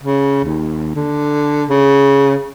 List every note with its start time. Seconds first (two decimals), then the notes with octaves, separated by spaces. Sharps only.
0.03 C#3
0.44 D#2
0.95 D3
1.70 C#3